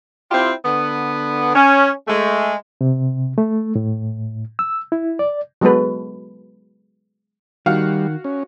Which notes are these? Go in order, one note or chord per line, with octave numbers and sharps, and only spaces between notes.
C4 E4 F4 G4
D3 B3
C#4
G#3 A3
C3
A3
A2
E6
E4
D5
F#3 G#3 B3 F#4 A4 B4
D#3 G3 F#4 F5
C#4